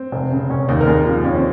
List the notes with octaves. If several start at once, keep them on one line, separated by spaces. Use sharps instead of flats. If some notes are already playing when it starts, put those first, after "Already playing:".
Already playing: C4
F1
C#3
F1 C#4
D#2 D#4
A#4
D#2 G#4
F3
D#2 C#4
C4